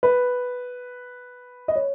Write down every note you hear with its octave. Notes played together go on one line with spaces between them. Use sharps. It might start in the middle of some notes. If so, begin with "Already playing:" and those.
B4
D#5
C#5